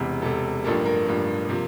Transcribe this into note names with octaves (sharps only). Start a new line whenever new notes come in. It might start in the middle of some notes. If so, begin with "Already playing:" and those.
Already playing: E1 E2 C3
E1 E2 C3 A4
A1 G2 F3 A#3 A4
A#4
A1 G2 F3 A#3
C3 F3 A#3